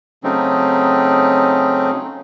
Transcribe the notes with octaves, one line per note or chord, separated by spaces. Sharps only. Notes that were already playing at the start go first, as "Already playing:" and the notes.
C#3 F#3 A3 C4 C#4 D#4